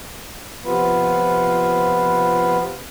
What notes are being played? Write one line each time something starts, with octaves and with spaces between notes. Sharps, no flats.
C3 F3 B3 F4 B4